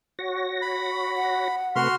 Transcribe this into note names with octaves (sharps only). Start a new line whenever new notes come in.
F#4 C#5 A#6
B5
F#5
C3 A3 F#4 B4 C6 F6